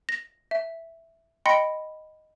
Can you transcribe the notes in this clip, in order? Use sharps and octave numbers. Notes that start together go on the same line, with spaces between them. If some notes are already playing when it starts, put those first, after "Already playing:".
A#6
E5
D#5 G5 B5 C6 A#6 C#7